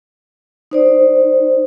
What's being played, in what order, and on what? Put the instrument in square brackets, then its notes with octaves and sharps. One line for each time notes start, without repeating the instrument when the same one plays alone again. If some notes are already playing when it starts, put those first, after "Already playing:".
[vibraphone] D#4 C5 D5